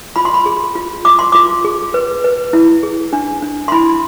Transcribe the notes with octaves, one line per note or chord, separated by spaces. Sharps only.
F4 B5
C6
B5
G#4
F4
F4 D6
C6
F4 D6
G#4
B4
B4
E4
G#4
D4
D4
C6
E4 B5